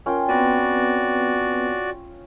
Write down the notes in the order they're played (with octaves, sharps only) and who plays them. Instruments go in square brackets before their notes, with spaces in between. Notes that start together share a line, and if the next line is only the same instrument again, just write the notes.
[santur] C#4 F4 G5 [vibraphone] A#4
[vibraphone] B3 C4 B4 [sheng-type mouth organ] F#4 D5